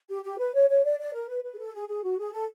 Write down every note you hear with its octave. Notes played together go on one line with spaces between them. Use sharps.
G4
G4
B4
C#5
C#5
D5
D5
A#4
B4
B4
G#4
A4
G#4
G#4
F#4
G#4
A4